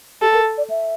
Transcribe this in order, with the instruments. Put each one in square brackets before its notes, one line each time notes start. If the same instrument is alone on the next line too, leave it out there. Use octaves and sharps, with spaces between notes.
[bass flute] G4 [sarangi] A4
[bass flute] A#4
D5
E5